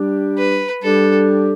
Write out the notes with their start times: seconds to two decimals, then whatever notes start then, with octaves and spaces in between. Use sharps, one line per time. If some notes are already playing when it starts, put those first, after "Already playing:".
Already playing: G3 D4 G4
0.38 B4
0.83 G3 D4 G4 A4